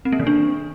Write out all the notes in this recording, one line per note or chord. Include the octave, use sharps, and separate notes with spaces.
C4
A#3
D#3
D4